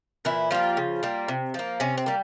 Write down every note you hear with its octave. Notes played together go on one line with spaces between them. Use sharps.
A#2 E3 E4
F3 G3 A#3 F4
C#3
G3 A#3
C3
F3 A#3
C3 C#4
C4
G3 A#3